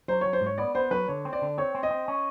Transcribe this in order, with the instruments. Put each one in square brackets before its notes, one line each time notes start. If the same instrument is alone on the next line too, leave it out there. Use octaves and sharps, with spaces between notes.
[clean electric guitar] F#3 [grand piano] C5
[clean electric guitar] F#3 [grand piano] C#5
[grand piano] C5
[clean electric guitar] G#2
[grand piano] C#5
[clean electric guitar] B3 [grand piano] D5
[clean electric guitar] B3 [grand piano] C5
[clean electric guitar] F#3 [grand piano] B4
[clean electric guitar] D3 [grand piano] C#5
[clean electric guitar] C4
[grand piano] D5
[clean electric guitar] D3
[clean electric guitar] C4 [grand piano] C#5
[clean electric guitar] C4
[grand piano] D#5
[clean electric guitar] C4
C#4